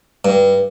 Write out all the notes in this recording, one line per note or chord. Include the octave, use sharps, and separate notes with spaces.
G2